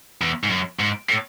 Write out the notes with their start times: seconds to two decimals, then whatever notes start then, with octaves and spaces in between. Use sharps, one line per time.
0.21 E2
0.44 G#2
0.50 F#2
0.79 G#2
1.08 A2